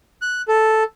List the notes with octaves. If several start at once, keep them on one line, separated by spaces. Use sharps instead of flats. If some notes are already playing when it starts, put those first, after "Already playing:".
F#6
A4